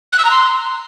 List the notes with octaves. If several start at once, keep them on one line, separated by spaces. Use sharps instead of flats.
F#6
E6
A#5
C6